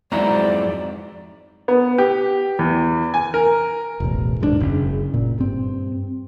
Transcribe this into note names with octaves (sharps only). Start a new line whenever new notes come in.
F2 G#2 F#3 G#3 C4 E4 D5 A#5
B3
G4
E2
G#5
A#4
E1 A1
D#1 G#2 G3 D4
F#1 C#3
A#2
G2 C4